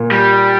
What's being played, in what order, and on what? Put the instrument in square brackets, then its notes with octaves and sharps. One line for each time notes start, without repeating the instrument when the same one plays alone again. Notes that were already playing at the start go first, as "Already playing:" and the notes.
Already playing: [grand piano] A#2
[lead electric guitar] G3